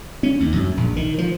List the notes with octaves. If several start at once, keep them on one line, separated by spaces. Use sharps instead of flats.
C#4
D#2
F#2
A#1
D#3
F3